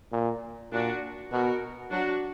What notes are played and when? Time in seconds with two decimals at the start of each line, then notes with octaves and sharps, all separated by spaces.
0.12 A#2
0.72 A#2 D4 F#4
1.32 B2 F#4 A#4
1.91 F#3 D4 F#4